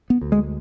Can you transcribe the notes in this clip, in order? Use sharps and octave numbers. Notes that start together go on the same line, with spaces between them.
B3
D2
G#3